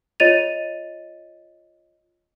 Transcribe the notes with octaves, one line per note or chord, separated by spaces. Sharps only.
F4 C#5 D#5 A6 D#7 F7